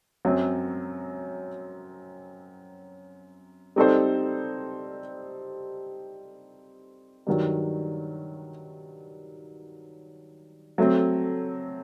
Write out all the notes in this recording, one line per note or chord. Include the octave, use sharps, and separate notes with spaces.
F#2 F#3 C4
G3 C4 D#4 A4 C5
G2 D#3 F#3
F#3 A3 C4